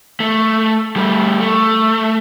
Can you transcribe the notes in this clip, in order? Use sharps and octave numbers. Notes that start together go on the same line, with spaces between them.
A3
G3 A3
A3